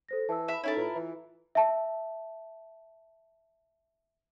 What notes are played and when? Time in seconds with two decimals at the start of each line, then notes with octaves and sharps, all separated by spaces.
0.09 A4 C5 A#6
0.29 E3 A5 E6
0.48 E5 B5
0.64 C#4 D#4 E4 A4 A#4 A5
0.77 A2 F4 B4
0.95 E3
1.55 E5 A5